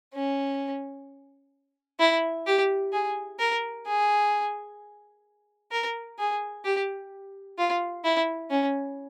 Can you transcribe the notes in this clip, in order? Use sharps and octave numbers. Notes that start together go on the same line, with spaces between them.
C#4
E4
G4
G#4
A#4
G#4
A#4
G#4
G4
F4
E4
C#4